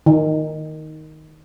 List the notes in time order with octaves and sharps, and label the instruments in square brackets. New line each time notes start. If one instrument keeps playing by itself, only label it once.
[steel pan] D#3